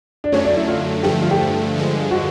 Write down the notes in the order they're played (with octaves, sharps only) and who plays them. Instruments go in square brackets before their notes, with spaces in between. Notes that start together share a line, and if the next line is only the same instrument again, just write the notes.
[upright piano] D4
[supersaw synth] F#2 D3 F#3 A3 [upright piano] C#4
[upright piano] D4
E4
F4
[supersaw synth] G2 D3 F3 A3 [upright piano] G4
[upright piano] F4
G4
[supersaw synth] G2 D3 F3 G#3
[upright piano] F#4